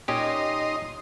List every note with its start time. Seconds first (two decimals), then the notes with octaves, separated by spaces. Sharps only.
0.08 A#2 C#4 D#4 G4 D#5 C6